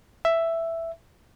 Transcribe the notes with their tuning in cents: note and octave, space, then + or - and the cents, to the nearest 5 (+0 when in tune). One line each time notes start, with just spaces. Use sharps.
E5 +5